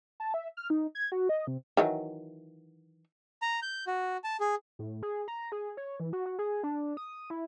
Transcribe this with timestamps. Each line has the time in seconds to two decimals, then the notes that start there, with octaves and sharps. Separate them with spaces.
0.20 A5
0.34 E5
0.57 F6
0.70 D#4
0.95 G#6
1.12 F#4
1.29 D#5
1.47 C3
1.77 D#3 E3 F#3
3.42 A#5
3.62 G6
3.87 F#4
4.24 A5
4.40 G#4
4.79 A2
5.03 G#4
5.28 A#5
5.52 G#4
5.77 C#5
6.00 E3
6.13 F#4
6.26 F#4
6.39 G#4
6.63 D4
6.97 D#6
7.30 E4